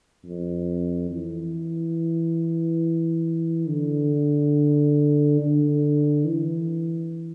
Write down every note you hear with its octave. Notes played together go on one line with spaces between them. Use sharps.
F2
E3
D3
D3
E3